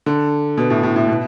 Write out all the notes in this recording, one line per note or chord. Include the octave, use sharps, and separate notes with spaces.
D3
B2
A2
A2
A2
B2